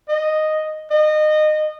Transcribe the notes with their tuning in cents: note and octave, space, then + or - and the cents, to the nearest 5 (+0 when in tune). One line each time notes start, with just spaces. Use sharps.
D#5 -5
D#5 -25